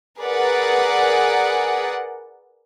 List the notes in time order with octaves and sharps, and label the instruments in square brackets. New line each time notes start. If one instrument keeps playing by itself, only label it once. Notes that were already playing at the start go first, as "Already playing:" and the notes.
[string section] G#4 A#4 B4 D5 F#5